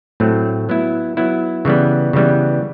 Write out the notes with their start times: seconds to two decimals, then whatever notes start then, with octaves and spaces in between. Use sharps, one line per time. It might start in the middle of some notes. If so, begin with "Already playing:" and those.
0.20 A2 F#3 A3 C4
0.69 F#3 B3 E4
1.17 F#3 B3 E4
1.65 C#3 E3 G3 B3
2.13 C#3 E3 G3 B3